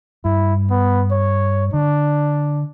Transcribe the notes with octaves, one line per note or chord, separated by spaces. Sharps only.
G2 E4
B3
C#5
D3 D4